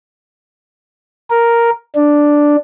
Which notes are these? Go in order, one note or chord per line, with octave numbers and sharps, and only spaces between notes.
A#4
D4